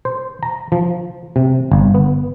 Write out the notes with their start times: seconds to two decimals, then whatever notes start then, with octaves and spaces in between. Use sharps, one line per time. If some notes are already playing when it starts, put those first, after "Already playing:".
0.05 C5
0.43 A#5
0.72 F3
1.36 C3
1.72 G1
1.94 B3